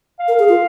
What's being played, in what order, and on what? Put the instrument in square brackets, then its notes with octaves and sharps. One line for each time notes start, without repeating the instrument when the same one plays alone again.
[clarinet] F5
[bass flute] A#4
G#4
F4